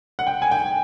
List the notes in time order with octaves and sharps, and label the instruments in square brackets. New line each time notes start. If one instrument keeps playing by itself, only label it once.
[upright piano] F#5
G5
G#5
G5